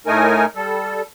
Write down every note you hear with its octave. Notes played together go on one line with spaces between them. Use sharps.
A2 A3 D#4 A#4 G#5
G3 A4